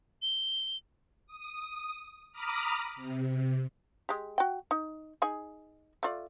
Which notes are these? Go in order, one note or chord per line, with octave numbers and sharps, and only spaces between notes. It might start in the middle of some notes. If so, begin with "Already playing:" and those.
G7
D#6
A#5 B5 D6 D#6 F6
C3
G#3 G4
F#4 G5
D#4
D#4 G#4 G#5
A3 F4 D5